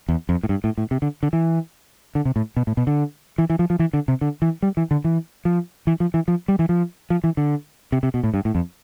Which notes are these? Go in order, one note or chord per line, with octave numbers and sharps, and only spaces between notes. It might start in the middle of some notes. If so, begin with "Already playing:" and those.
E2
F2
A2
G2
A2
A2
C3
D3
D3
E3
D3
C3
A2
B2
A2
B2
D3
E3
E3
F3
F3
E3
D3
C3
D3
E3
G3
E3
D3
E3
F3
E3
F3
E3
F3
G3
E3
F3
F3
E3
D3
C3
C3
B2
A2
G2
A2
F2